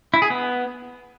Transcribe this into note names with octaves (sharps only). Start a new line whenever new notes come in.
E4
G#4
B3